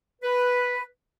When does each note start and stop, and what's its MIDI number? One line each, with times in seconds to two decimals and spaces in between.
0.22 0.82 71